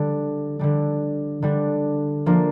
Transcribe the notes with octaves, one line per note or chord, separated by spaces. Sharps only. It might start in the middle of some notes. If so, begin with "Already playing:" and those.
Already playing: D3 G3 D4
D3 G3 D4
D3 G3 D4
F3 A#3 D4